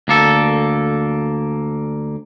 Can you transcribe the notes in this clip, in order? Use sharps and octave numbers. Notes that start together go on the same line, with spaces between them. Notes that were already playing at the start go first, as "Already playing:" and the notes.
D2 A#3 A4